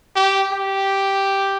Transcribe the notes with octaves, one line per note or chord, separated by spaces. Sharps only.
G4
G4